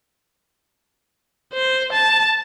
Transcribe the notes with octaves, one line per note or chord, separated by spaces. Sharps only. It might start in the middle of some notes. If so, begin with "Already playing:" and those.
C5
A5